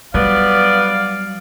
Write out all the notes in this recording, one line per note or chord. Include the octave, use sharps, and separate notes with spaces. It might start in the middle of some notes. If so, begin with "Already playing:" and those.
F#3 G3 B3 D5 F5